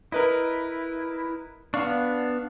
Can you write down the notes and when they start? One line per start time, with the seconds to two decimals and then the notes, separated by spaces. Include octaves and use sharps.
0.12 E4 A#4 B4 D#5
1.74 B3 D4 F5 C#6